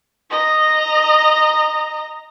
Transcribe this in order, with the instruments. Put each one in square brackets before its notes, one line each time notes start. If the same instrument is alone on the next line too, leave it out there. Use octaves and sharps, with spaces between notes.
[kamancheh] D#5 A#5